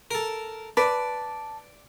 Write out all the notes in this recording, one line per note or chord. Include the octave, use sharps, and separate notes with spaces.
A4 A#4
B4 D5 A5